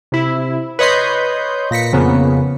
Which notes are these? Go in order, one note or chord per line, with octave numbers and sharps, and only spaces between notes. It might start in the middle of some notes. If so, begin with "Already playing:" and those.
C3 E4
B4 C#5 D#5 C6 G6
A#2 A#6 B6 C#7
F2 C#3 A#3 B3